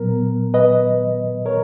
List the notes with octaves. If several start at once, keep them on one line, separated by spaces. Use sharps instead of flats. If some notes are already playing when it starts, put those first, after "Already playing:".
Already playing: A#2 F#3 B3 A#4
B4 D#5
A#4 C#5